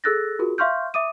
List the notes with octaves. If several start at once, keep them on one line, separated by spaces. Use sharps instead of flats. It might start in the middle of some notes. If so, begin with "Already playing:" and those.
G#4 A4 E6 F#6 A6 A#6
F4 F#4 G#4 A#4
E5 F5 C6 C#6 F6 G6
E5 D6 D#6 D#7